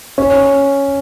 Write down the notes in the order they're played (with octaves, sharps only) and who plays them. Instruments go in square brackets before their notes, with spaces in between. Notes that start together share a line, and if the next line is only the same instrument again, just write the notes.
[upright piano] C#4